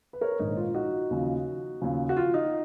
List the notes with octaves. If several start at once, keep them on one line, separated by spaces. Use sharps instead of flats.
B4
A#4 C#5
A#1 G#2 D#3 D#4
F4
D#4 F#4
D#2 C#3 F3
D#2 C#3 F3
F#4
F4
D#4